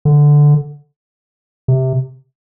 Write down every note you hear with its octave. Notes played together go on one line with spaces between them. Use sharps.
D3
C3